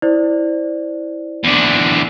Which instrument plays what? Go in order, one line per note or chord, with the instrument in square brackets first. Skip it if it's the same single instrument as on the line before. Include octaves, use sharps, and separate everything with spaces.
[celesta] E4 C5 D5
[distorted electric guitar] E2 D3